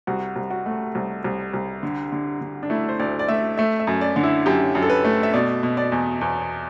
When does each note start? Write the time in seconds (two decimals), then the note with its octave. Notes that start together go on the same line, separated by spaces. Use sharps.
0.07 C2 F#4
0.36 C2
0.50 F#4
0.66 A3
0.95 C2
1.24 C2
1.53 C2
1.83 D3
2.12 D3
2.41 D3
2.63 D4
2.70 A3 E4
2.89 C5
2.99 D2 D5
3.19 D5
3.28 A3 E5
3.58 A3 E5
3.80 E5
3.87 F#2
4.01 D5
4.16 D3
4.23 E4
4.46 F#2 G4
4.75 F#2
4.83 A4
4.90 B4
5.04 A3
5.23 E5
5.34 B2 D5
5.63 B2
5.77 D5
5.92 E2
6.21 E2